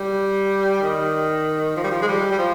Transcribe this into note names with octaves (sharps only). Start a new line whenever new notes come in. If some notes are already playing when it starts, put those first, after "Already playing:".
Already playing: G3
D#3
F3
G3
F3
G#3
G3
G3
F3